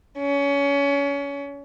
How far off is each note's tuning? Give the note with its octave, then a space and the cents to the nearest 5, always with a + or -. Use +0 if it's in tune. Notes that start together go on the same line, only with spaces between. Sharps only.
C#4 +25